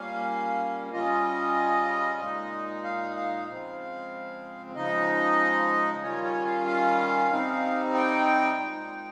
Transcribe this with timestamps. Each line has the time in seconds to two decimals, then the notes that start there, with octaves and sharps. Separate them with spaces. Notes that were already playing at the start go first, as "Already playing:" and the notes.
Already playing: A#2 G3 A#3 C#4 F5
0.93 C#3 G3 C#4 F4 D#5
2.20 A#2 G#3 D#4
2.84 F5
3.16 F5
3.48 C#3 F3 G#3 C4 F5
4.75 C#3 F3 G#3 D#4 D#5
6.03 D#3 G3 C#4 F4 C#5
6.24 C#5
6.45 F5
6.67 F5
7.31 C3 G3 C4 D#4
7.94 G5
8.58 A#2 G#3 D#4